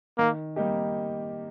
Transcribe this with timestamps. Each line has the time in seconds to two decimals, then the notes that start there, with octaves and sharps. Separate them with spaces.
0.18 D#3 A#3
0.56 G3 A#3 D#4 G4